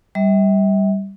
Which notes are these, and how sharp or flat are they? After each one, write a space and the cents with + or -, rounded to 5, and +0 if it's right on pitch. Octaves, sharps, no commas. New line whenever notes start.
G3 +0 E5 -35